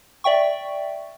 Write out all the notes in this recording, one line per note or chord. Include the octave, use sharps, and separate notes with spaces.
D5 E5 G5 C#6